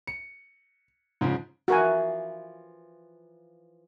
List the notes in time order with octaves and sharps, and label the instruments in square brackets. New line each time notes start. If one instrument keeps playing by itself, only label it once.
[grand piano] C#7
G#2 C#3 F3
[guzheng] E3 F3 [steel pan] F#4 A#4 G#5